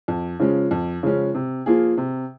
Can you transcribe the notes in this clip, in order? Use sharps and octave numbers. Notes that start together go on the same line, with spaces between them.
F2
C#3 F3 G#3 C#4
F2
C#3 F3 G#3 C#4
C3
F3 A#3 F4 G#4
C3